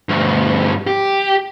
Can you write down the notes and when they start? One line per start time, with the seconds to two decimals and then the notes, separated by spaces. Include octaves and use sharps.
0.09 D2 G2
0.87 G4